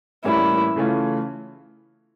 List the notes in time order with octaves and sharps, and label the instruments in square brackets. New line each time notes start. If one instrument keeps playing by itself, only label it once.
[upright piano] A2 E3 G3 A#3 C#4 [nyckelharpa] E4
[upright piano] C#3 E3 A3 C#4 F4